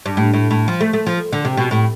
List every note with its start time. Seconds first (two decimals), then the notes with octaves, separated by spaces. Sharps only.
0.06 G2
0.17 A2
0.33 A2
0.51 A2
0.68 F3
0.81 A3
0.93 A3
1.07 F3
1.32 D3
1.45 C3
1.57 B2
1.71 A2